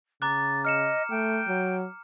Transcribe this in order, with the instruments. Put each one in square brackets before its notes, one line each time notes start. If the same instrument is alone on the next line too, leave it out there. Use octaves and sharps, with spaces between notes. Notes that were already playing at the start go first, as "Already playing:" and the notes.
[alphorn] C#3 [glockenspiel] A#5 D6 F#6 [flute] A6
[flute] D#5 [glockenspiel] F6 C#7 E7
[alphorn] A3 [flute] G5
[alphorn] F#3